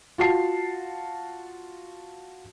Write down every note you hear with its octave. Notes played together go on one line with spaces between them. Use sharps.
F4 F#4 A5 C7